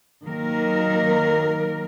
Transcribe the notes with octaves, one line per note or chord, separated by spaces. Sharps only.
D#3 F#3 A#3 A#4